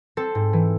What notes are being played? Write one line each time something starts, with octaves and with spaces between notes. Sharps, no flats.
C4 A4
G#2
E3